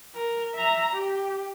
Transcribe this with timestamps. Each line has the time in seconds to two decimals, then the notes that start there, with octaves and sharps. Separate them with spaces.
0.15 A#4
0.55 E5 A#5
0.93 G4